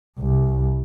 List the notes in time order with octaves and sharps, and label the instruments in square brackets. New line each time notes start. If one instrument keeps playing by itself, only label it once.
[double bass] C2